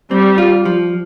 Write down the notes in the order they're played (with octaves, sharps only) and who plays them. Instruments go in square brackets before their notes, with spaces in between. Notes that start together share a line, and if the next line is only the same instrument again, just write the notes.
[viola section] G3 [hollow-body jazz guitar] C4
[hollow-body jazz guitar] F4
F3